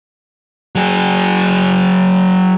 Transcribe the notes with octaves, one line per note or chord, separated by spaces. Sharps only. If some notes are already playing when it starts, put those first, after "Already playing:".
F#3 G#4